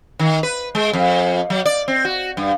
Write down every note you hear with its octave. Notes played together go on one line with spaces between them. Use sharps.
D#3
B4
G#3
F2
F#3
D5
C4
F#4
G2